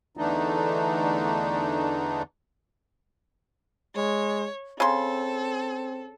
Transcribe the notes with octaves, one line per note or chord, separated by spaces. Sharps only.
E2 D3 E3 A3 D4 D#4
G#3 C#5
C#3 C4 A4 C6